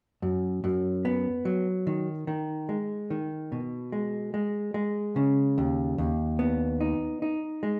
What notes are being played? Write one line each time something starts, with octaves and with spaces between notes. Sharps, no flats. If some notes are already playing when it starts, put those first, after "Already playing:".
F#2
F#2
B3
F#3
D#3
D#3
G#3
D#3
B2
G#3
G#3
G#3
C#3
D#2
D#2
B3
D#4
D#4
G#3